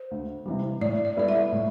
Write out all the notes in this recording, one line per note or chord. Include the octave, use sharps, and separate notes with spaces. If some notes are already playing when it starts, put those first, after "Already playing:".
Already playing: C5
D2
C3 E3 G3
A2 D5
D5
G3 B3 E4 A4 D5
E5
A2